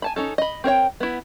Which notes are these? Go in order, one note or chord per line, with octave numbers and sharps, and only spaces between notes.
G#5 A5 B5
C#4 D#4 A4
D#5 B5
C4 A#4 C#5 G5
B3 E4